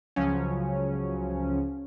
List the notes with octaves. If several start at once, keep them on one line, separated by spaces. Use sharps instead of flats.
C#2 C#3 F3 F#3 C#4